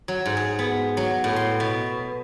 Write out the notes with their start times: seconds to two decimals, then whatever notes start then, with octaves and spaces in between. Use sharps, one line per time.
0.08 F#3
0.26 G#2
0.37 G#4
0.59 B3
0.97 F#3
1.24 A2
1.36 C6
1.60 B2